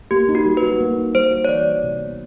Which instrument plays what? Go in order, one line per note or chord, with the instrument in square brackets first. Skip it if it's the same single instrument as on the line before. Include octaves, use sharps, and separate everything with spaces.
[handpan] A#3 [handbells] G4
[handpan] D#4
[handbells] F#4
[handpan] G3
[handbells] B4
[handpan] F#4
A#3
D#4
[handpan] G3 [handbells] C5
[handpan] F#4
[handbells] C#5
[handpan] E3 [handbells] D5
[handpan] G3
C3
B3